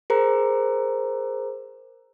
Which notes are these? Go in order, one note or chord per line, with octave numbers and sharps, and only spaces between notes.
G#4 A#4 C5 A#5